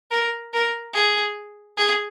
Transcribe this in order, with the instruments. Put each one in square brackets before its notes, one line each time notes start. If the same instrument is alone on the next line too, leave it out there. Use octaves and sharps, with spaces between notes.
[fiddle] A#4
A#4
G#4
G#4